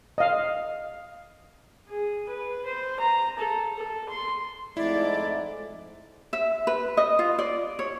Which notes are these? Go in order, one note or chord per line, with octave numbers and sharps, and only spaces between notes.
D#5 F5
G#4
B4
C5
A#5
A4
A4
C6
F2 G#2 A3 E4 D5
E5
B4
D#5
F4
D5
C#5